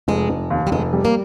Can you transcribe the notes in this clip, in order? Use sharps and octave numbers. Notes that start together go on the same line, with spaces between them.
F1 G#3
F1
D#2
G3
F1 G#3
G3
A#3